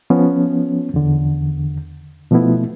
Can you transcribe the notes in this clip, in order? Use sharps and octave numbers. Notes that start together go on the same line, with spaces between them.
F3 B3 C#4
E2 D3
B2 F3 A3 B3 E4